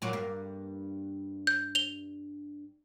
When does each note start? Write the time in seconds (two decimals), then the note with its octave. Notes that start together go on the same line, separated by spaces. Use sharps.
0.02 A#2 F#3 F#4
0.13 G2 A#3
1.47 G6
1.75 F7 G7